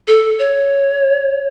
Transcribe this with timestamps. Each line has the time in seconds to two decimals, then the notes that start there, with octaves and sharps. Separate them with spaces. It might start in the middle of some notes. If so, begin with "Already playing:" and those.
0.08 A4
0.39 C#5